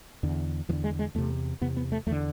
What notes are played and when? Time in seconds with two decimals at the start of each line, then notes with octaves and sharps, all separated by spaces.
0.23 E2 D3
0.69 E2 F3
0.73 D3
0.84 G#3
0.99 G#3
1.15 E2 C3 A3
1.61 E2 C3 B3
1.77 B3
1.92 A3
2.06 E2 A3
2.11 D3